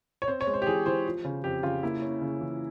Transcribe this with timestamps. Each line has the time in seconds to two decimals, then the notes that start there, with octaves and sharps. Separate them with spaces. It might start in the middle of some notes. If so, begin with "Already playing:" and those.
0.22 C#5
0.28 C4 C5
0.41 C#5
0.47 G#3
0.54 C5
0.62 G4
0.67 E3 G#4
0.86 E3 C5
1.06 F3
1.25 C#3
1.44 F2 G4
1.63 C#3 F4
1.83 A#3 E4
2.02 C#4
2.22 C#3
2.41 E3